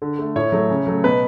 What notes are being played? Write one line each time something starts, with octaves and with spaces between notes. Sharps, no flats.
D3
A3
A2 C#5
F#3 A3
C#3
F#3 A3
B2 B4